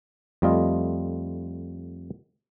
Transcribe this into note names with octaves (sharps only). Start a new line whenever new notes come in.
F2 G3 A3 F4 D#5